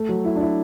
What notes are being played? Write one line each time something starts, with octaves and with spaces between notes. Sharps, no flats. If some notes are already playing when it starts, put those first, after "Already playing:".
Already playing: A3
F#3
E4
D4
E4